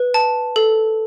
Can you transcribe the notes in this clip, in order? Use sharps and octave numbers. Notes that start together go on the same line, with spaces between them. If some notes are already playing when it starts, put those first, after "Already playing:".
Already playing: B4
A5
A4